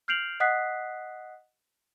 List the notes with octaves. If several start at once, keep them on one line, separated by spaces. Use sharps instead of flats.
F6 G6 C7 D7 F7 F#7
D#5 F#5 D#6 F#6 B6 C7